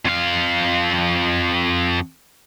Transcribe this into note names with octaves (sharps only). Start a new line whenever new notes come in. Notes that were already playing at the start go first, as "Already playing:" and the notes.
F2 F5